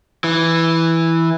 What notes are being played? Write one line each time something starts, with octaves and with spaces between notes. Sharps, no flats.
E3